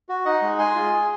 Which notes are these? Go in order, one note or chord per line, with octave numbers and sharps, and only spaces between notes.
F#4
D#4 D#5 F#5
G#3
G#4 G#5 C6
F4
G#4